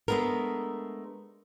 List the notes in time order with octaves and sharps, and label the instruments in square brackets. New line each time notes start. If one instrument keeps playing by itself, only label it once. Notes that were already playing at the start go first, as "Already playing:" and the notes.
[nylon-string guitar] G#3 A3 B3 D4 A#4